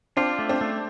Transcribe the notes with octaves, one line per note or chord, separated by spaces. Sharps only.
C4 D4 F4
A3
C4 D4
A3